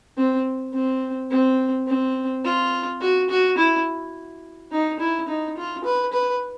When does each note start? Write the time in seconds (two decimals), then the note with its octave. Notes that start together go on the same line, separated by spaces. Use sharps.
0.17 C4
0.73 C4
1.30 C4
1.87 C4
2.45 F4
3.01 F#4
3.30 F#4
3.57 E4
4.71 D#4
4.99 E4
5.28 D#4
5.57 F4
5.84 B4
6.13 B4